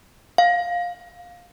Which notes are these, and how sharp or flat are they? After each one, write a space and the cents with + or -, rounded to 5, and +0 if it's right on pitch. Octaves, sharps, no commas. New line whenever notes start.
F5 +10